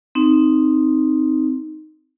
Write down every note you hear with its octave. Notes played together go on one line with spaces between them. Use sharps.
C4 D#4